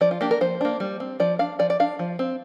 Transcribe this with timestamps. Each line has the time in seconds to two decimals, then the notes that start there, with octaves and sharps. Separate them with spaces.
0.01 F3 D5
0.11 F4
0.21 A#3 D4 G4
0.31 A#4
0.41 F3 C5
0.61 A#3 D4
0.80 G3
1.00 C4
1.20 F3 D5
1.39 D4 F5
1.59 F3 D5
1.70 D5
1.80 D4 F5
1.99 F3
2.19 C4